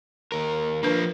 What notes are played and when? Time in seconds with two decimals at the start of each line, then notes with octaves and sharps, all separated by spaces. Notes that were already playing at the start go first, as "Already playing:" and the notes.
0.32 D#2 A#4
0.83 F3 A#3 D4 B4